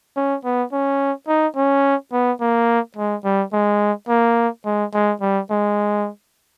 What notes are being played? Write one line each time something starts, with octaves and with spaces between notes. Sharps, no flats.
C#4
B3
C#4
D#4
C#4
B3
A#3
G#3
G3
G#3
A#3
G#3
G#3
G3
G#3